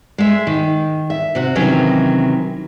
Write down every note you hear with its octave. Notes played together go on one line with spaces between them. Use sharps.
G#3 E5
D#3
E5
C3 F#4
C3 D#3 E3 F#3 C#4